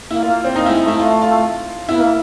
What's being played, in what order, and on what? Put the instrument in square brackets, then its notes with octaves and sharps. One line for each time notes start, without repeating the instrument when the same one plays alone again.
[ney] A#3 [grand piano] E4
[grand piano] F4
[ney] A#3
[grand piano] C4
[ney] A#3 [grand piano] D#4
[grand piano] E4
[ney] G#3
[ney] A3 [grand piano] E4
[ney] A3 [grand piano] F4
[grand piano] F4
[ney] B3 [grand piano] E4
[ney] A#3